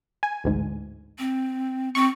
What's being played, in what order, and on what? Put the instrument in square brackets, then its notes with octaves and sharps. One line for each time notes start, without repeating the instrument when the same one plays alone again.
[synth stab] G#5
A1 D2 G#2
[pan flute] C4
[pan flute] C4 [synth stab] C#6